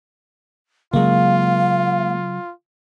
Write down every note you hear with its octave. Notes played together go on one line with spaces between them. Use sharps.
C#3 F#3 G#3 A#3 F4 F5